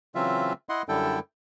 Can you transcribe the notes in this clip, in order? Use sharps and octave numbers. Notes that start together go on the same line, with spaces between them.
C#3 E3 F#3 C4 F4 E5
E4 D#5 F#5 C6
F#2 D3 G3 E4 A4 G5